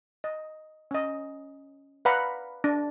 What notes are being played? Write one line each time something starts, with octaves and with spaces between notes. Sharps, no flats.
D#5
C#4 D#5
B4 D5 F5 F#5 A#5 B5
D4